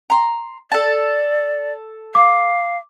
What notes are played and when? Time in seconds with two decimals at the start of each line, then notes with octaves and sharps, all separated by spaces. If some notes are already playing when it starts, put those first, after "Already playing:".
0.10 A#5 C6
0.72 A4 D5 A5
2.15 F5 D6